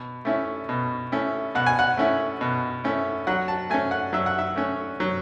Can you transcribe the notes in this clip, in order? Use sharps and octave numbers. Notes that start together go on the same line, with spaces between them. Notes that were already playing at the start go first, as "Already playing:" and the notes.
Already playing: B2
A3 C#4 E4
B2
A3 C#4 E4
B2 F#5
G#5
F#5
A3 C#4 E4
B2
A3 C#4 E4
F#3 F#5
A5
A3 C#4 G#5
F#5
F#3 E5
F#5
E5
A3 C#4
F#3